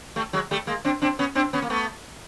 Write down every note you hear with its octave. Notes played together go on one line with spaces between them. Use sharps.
G3 A3
F#3 G#3
G3 A3
G#3 A#3
C4 D4
C4 D4
B3 C#4
C4 D4
B3 C#4
A#3
A3 B3